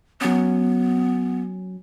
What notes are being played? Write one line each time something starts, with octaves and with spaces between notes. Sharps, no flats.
F#3 B3 C#4